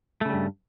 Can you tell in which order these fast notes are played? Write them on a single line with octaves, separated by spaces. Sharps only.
A3 C#3 G3 G2